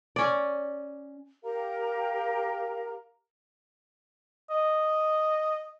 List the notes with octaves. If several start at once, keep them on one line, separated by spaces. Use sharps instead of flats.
C#4 D5
G4 A#4 F5 A#5
D#5